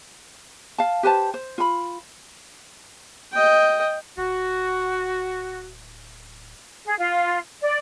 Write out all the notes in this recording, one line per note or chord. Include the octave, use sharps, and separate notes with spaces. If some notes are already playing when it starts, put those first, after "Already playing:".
F5 A5
G4 B4 C5 A5
C5
F4 B5
D#5 G5
D1 F#4
G#4
F4
D5